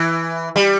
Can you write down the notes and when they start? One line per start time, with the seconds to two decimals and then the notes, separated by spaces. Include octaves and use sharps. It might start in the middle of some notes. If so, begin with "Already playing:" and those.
Already playing: E3
0.56 G3